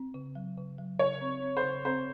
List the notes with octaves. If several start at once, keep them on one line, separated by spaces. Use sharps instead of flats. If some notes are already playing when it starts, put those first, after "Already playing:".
Already playing: C4
C#3
F#3
C#3
F#3
C#3 C#5
C4
C4
C5
C#3
C4 C5